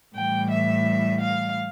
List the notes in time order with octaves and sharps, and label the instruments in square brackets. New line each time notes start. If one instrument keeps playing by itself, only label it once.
[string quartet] A2 E3 G3 G5
E5
F5